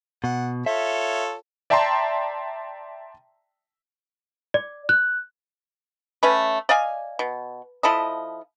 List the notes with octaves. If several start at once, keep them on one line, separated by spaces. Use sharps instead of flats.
B2 F#5
F4 A4 C#5 E5
D5 E5 G5 A5 A#5 C6
D5
F#6
A3 C#4 B4
D5 D#5 F5 G#5
B2
F3 E4 A4 D#5